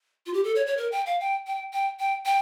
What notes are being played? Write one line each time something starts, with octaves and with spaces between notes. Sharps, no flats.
F4
G4
A4
C#5
C#5
A#4
G5
F5
G5
G5
G5
G5
G5